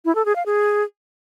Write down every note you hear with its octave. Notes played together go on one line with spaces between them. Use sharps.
E4
A4
G#4
F5
G#4